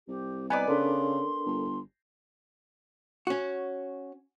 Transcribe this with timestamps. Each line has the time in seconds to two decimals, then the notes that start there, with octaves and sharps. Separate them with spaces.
0.08 C2 G4
0.50 B3 B4 D5 D#5 G#5 A#5
0.68 C#3 D4 A4 A#4 C6
1.46 G1
3.27 C#4 F#4